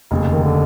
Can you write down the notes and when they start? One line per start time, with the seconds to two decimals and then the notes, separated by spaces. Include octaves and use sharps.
0.11 F1 D#2 C#3
0.32 D#3
0.43 D3